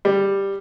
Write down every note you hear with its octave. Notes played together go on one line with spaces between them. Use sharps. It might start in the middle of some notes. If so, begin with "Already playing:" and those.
G3